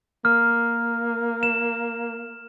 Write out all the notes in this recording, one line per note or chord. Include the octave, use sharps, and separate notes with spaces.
A#3 F6
E7